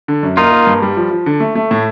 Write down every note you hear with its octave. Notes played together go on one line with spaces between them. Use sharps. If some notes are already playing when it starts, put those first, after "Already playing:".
D3
F#2
A#3 D#4 F4
A#3
G2
G3
F3
F3
D3
A3
A3
A2